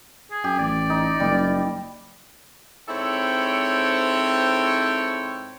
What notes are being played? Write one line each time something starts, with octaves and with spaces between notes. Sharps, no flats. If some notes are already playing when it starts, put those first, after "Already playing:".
G#4
F#2 G4
A1 D5
D#4
F#1 G3
G#2 C4 E4 A4 C#5 G5